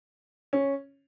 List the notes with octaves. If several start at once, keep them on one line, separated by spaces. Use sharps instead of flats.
C#4